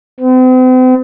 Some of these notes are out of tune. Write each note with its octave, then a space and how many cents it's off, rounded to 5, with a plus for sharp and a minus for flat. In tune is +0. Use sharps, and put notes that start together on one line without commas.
C4 -45